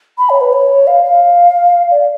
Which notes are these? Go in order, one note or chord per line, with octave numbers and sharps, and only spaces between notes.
B5
C#5
B4
C#5
F5
F5
D5